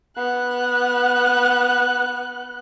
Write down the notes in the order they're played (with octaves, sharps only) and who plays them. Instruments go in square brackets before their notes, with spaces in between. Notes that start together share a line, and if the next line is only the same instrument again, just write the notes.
[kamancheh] B3 F#6